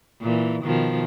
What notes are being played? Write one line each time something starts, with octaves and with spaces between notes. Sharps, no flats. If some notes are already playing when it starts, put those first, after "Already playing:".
A#2 E3
B2 D#3 F3